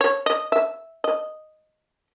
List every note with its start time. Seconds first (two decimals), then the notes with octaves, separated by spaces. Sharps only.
0.01 C#5
0.26 D#5
0.52 E5
1.04 D#5